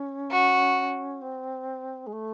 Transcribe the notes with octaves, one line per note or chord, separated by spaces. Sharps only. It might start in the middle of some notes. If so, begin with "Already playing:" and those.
Already playing: C#4
F#4
C4
G#3
A3